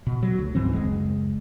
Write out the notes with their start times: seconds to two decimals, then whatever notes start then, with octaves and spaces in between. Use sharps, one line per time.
0.07 B2
0.23 F#3
0.39 D2
0.55 D2 G#2 E3 C4
0.74 F#1 G#3